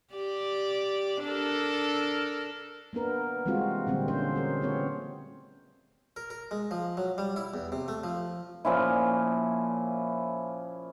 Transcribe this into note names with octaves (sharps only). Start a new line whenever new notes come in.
G4 D5
D4 A4 A#4
A#3 B3 D4 A#4 B4
E3 G3 G#3 C4 F4 F#4
A#2 D3 F#3 G3 A#3 C4
C#4 D4 C5
C#4 G#4 A#4
C#3 A3 B3 C4 F4 C#5
A#4
A#4
G#3
F3
F#3
G3
E4
E2
C3
A3
F3
A#2 F3 C#4 E4